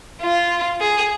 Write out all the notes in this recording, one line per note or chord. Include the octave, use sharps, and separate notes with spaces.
F4
G#4